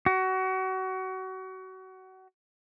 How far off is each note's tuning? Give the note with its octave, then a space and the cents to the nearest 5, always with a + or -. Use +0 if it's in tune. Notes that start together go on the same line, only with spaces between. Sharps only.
F#4 +30